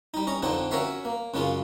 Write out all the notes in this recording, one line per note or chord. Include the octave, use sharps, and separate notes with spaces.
G3 D#4
C#4 D#5 A#5
F2 D3 C4 D4 D#4
C#4 F#4 A#4 C#5 E5 F5
A#3
F#2 C#3 G#3 C#4 F4